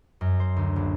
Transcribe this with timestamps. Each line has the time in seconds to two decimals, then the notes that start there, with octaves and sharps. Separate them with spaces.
0.21 F#2
0.40 C5
0.56 D2
0.76 A#1